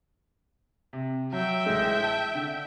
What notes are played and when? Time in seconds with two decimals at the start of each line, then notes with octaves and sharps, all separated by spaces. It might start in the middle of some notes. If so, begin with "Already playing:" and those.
0.93 C3
1.32 F#3 E5 G5
1.66 A1 G#3
2.03 A5
2.35 D3